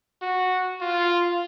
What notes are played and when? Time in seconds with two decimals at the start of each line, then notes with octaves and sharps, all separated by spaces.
0.22 F#4
0.81 F4